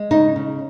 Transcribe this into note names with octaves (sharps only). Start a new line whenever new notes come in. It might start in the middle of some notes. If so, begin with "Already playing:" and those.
Already playing: G#3
C#3 D#4
C#3